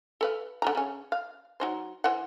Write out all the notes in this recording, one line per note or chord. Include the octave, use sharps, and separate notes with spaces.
A4 B4 F5
D3 F4 A#5
C#3 C#4
F5
F#3 D#4 C5
E3 C5 F#5